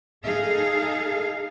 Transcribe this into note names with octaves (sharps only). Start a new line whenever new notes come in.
D#4 G#4 A4 F5